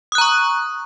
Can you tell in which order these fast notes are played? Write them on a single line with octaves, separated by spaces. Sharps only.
D#6 F#6 A#5 C#6